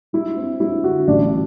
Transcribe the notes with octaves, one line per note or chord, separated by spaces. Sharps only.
F#3 E4
C4
F#3 E4
D3 F#4
A1 D4